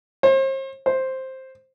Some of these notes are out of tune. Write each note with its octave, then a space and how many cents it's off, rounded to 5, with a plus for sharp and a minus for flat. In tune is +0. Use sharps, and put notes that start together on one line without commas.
C5 +40
C5 +5